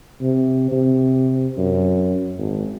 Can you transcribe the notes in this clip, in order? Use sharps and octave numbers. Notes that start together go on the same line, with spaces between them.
C3
C3
F#2
G#1